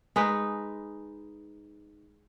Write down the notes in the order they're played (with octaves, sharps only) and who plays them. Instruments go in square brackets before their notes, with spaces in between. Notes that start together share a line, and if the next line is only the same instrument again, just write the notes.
[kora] G#3 D#4 B4